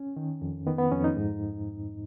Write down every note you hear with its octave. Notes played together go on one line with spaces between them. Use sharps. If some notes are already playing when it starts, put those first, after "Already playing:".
Already playing: C#4
D#3
F2
D#3 B3
B3
F2 C#4
D#4
G#2